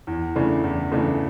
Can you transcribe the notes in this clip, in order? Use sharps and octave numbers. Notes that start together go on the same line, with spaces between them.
E2
C#3 E3 A3 D4
E2
C#3 E3 A3 D4